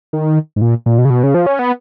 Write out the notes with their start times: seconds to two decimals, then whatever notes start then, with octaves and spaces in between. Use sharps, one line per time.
0.13 D#3
0.56 G#2
0.62 A#2
0.86 A#2
0.98 B2
1.05 C#3
1.10 B2
1.23 C#3
1.34 F3
1.47 C#4
1.59 B3